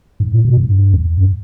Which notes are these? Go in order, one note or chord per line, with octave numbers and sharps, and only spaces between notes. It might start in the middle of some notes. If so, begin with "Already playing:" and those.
G#2
A#2
B2
G#2
G2
E2
G2